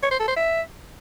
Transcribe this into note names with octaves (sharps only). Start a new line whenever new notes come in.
C#5
C5
A4
C5
E5